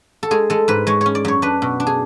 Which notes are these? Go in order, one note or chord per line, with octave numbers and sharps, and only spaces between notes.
A4
G#3 G#4
G#3 A4
G#2 B4
G#3 C#5
C#4 C#5
D5
F#2 C#5
D4 B4
B2
D4
G#4